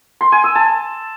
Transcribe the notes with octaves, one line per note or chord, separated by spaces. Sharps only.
C6
G#5
E6
A5